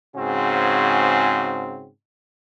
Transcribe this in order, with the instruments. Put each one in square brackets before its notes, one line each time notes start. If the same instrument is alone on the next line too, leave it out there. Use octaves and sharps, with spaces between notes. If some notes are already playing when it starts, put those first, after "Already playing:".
[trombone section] G#2 C#3 C4 F#4